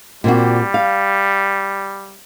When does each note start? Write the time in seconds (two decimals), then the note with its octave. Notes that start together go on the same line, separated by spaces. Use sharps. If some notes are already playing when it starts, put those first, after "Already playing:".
0.24 A#2 G3 C4 F#4
0.74 F5